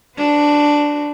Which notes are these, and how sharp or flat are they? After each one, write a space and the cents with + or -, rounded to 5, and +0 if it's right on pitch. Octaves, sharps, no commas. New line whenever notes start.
D4 +0 F#4 +0 B4 +45